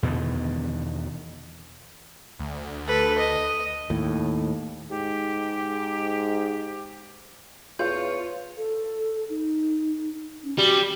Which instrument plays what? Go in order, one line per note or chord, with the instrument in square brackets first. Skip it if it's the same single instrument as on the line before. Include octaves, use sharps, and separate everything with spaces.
[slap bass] E2 B2 D3 D#3
[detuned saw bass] D2
[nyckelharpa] A4 B4
D#5
[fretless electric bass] D#2 A2
[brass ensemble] G#2 [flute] G4
[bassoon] E2 [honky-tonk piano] F4 [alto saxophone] C#5 [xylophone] G6
[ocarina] A4
D#4
C#4
[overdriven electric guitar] G3 [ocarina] F#4